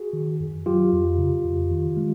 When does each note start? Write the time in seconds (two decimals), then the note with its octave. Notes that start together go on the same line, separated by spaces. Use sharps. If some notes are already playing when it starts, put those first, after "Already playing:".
Already playing: F#4 G#4
0.13 D#3
0.40 F#2
0.66 F#3 F4 G4
0.93 F2
1.18 C#3
1.45 F2
1.71 D#3
1.97 G#3